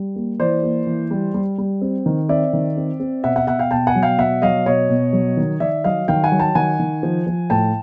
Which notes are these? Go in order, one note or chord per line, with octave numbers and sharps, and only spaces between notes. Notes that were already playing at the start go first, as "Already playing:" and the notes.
Already playing: G3
A#3
E3 C5 D5
A#3
E3
G3
G3
G3
C4
D#3
C4 D5 E5
D#3
C4
C4
B2 E5 F#5
E5 F#5
B2 E5 F#5
F5 G5
B2 G5 A5
F#5 G#5
F#3
F5 G5
B2 E5 F#5
F#3 D#5 F5
B2 C#5 D#5
B2
F#3
D#3
D#3 D5 E5
F#3 D#5 F5
D#3 F5 G5
F#5 G#5
F#3
G5 A5
D#3 F#5 G#5
D#3
F3
F3
A2 G5 A5